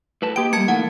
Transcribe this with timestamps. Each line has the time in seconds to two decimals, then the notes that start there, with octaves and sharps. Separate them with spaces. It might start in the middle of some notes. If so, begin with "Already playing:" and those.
0.22 A2 B4 A5
0.36 A#3 G4 G5 D7
0.53 G3 A#3 A5 G#6 C#7
0.68 A2 D#3 F3 F#5